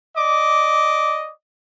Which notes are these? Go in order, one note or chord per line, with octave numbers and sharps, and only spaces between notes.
D5 D#5 D6